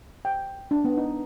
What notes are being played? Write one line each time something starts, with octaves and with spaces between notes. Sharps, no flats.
G5
D4
B3
D#4